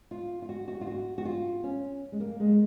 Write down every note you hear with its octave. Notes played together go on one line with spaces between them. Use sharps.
F4
F4
F#4
F#4
F4
F#4
F#4
F4
C#4
G#3
A#3
G#3